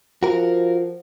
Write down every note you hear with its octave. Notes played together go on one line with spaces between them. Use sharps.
F3 F#4 A#4